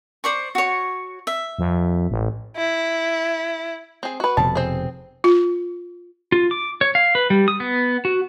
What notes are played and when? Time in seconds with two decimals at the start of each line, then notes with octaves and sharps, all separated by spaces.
0.24 C5 D5 C#6
0.55 F#4 C#5
1.27 E5
1.59 F2
2.10 A1
2.57 E4
4.03 C4 G#4
4.20 F#4 B4
4.37 F1 B2 A5
4.55 C4 G#4
5.24 F4
6.32 F4
6.51 D6
6.81 C#5
6.95 F5
7.15 B4
7.30 G3
7.48 D#6
7.60 B3
8.05 F#4